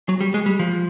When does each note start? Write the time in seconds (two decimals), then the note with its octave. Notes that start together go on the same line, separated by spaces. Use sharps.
0.09 F#3
0.21 G3
0.34 G#3
0.46 G3
0.59 F3